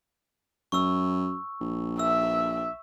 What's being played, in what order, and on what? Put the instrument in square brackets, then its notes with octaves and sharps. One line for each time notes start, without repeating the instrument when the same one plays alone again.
[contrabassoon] F#2 [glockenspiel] C#6 E6
[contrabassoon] A#1
[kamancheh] E5 [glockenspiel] E6